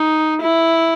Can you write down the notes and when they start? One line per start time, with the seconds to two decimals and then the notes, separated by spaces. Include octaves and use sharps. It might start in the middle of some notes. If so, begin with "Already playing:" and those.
Already playing: D#4
0.42 E4